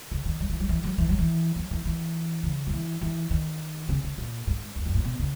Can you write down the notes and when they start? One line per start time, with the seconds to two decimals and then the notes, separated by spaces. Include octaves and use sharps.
0.11 C#3
0.25 D#3
0.40 F#3
0.49 E3
0.60 F#3
0.69 E3
0.84 F#3
0.98 E3
1.09 F#3
1.19 E3
1.56 F#3
1.71 E3
1.85 E3
2.43 C#3
2.67 F#3
2.72 E3
3.01 E3
3.31 D#3
3.89 C#3
4.03 C#3
4.18 A#2
4.47 G#2
4.76 E2
4.86 F#2
4.95 A#2
5.04 B2
5.19 C#3